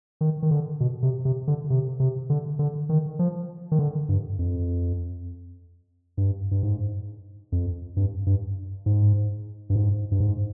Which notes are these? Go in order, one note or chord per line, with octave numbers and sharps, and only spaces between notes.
D#3
D#3
D3
B2
C3
C3
D3
C3
C3
D3
D3
D#3
F3
D#3
D3
G2
F2
G2
G2
G#2
F2
G2
G2
G#2
G2
G#2
G2
G#2